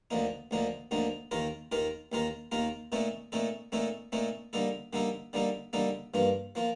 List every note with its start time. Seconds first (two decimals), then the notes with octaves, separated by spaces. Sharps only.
0.11 D2 D3 F3 A#3 D#4
0.51 D2 D3 F3 A#3 D#4
0.91 D2 D3 F3 A#3 D#4
1.31 D#2 D#3 A#3 F4 A#4
1.72 D#2 D#3 A#3 F4 A#4
2.12 D#2 D#3 A#3 F4 A#4
2.52 D#2 D#3 A#3 F4 A#4
2.92 A#2 A3 C4 D#4 A4
3.32 A#2 A3 C4 D#4 A4
3.72 A#2 A3 C4 D#4 A4
4.12 A#2 A3 C4 D#4 A4
4.53 D3 G3 A#3 D#4 A4
4.93 D3 G3 A#3 D#4 A4
5.33 D3 G3 A#3 D#4 A4
5.73 D3 G3 A#3 D#4 A4
6.14 G2 F3 A#3 F4
6.55 F3 A#3 F4